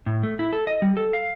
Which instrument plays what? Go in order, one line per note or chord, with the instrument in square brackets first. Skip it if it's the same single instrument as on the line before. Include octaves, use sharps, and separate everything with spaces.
[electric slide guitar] A2
A3
E4
A4
D#5
G3
A4
F5